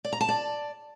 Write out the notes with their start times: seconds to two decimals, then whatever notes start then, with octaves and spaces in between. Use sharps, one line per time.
0.05 D5
0.13 A#5
0.21 A5
0.29 D5